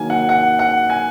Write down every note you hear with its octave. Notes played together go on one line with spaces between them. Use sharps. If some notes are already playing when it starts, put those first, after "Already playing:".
Already playing: D#3 F#3 A#3 G#5
F#5
F#5
F#5
G#5